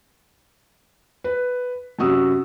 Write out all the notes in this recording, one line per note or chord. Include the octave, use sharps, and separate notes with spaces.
B4
F#2 C3 F#4 D#6 E6